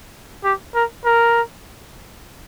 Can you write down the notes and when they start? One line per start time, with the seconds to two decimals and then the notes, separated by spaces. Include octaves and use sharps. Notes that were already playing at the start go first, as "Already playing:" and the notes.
0.44 G4
0.75 A#4
1.05 A#4